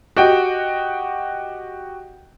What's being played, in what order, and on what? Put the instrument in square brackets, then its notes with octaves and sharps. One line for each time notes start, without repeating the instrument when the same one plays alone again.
[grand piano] F#4 G4 D#5 G5